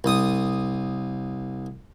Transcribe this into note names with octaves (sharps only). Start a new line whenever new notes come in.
C2 D#6